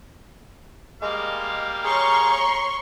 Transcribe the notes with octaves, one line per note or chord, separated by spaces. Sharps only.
G3 G#3 A#3 F5
G#4 C#5 A#5 C6 C#6